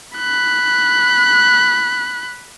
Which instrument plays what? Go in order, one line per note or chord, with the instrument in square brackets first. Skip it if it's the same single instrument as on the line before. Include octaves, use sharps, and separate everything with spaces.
[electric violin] B5 F#6